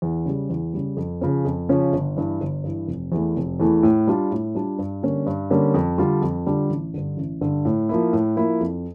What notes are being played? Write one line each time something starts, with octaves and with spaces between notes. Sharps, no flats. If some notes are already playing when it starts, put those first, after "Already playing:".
E2
C#3 G3
E2
C#3 G3
F2
C#3 F3 C#4
F2
C#3 F3 C#4
G1
G2 E3
G1
G2 E3
F1
E2 E3 A3
F1
E2 E3 A3
A2
G3 D4 F4
A2
G3 D4 F4
G2
D3 G3 A#3 C#4
G2
D3 G3 A#3 C#4
F2
D3 G3 D4 F4
F2
D3 G3 D4 F4
A1
G2 D3
A1
G2 D3
A2
F3 A#3 E4
A2
F3 A#3 E4
F2